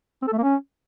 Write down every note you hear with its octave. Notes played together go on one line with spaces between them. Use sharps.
C4
A4
A3
A#3
C#4